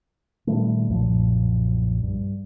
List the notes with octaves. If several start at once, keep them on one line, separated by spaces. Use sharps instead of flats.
A#2 D#3 G3 A3
B1 F#2 A#2 F3
G2